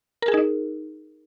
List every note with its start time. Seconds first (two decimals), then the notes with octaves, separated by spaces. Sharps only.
0.22 A#4
0.28 G#4
0.34 D#4